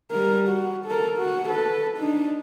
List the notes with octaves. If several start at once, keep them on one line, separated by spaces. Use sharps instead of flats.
G3 A#4
F#4
A4 A#4
F#4
A4 B4
D4 D#4